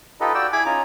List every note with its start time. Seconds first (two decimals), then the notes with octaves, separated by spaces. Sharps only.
0.20 D#4 F4 G4 A4 B4 D#5
0.34 F#4 D5 G5 E6
0.53 E4 G#4 G#5 B5 D6
0.66 C#4 D#4 F4 A#5